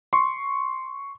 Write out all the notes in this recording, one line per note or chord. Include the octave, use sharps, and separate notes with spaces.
C6 C#6